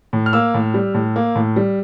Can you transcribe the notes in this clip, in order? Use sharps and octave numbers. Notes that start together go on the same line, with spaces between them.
A2
F6
A#3 E6
A2
G3
A2
A#3
A2
G3